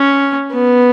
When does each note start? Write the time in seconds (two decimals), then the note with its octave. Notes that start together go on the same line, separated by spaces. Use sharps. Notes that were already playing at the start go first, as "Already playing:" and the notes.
Already playing: C#4
0.52 B3